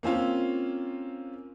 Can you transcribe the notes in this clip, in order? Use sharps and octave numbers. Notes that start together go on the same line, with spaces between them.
A#3 C4 C#4 F4